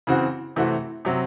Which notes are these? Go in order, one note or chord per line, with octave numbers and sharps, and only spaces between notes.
C#3 E3 C4 F#4
C3 E3 A3 C4 F#4
C3 F#3 C4